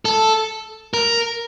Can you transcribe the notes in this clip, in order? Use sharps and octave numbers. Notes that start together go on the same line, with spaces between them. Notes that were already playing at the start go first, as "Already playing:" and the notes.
A4
A#4